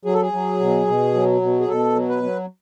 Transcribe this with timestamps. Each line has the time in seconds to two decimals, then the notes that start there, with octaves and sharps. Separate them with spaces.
0.05 F#3 G#4
0.13 A4
0.22 G#4
0.32 F#3
0.60 B2
0.87 B2
1.14 F#3
1.41 B2
1.60 G#4
1.69 B2 A4
1.95 F#3
2.09 B4
2.23 F#3